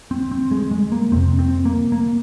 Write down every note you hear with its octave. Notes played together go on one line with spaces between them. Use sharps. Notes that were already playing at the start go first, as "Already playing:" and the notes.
C4
C4
G#3
G#3
A#3
F2 C3 C4
C4
A#3
A#3